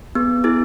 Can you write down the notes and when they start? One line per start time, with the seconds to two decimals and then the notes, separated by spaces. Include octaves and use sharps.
0.15 B3 G#4
0.44 B3 E4 G#4